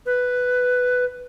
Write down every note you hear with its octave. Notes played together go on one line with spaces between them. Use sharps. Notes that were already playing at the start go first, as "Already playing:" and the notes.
B4